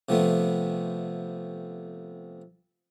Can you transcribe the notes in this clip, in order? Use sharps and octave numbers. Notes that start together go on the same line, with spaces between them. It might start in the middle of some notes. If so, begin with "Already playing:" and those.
C3 F3 A3 B3